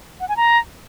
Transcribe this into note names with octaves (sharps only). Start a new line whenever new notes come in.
F#5
G#5
A#5